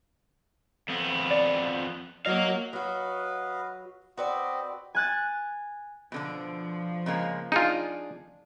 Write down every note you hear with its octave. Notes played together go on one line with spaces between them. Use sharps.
F2 B3
D5
F#3 A#3 A#4 D#5 F5
F#3 F#4 B4 D#5 F5
C4 F#4 B4 D5 D#5
G#5 F#6 A6
B2 D3 F3 D4
C#3 G#3 A#3
D4 D#4 F4 G#4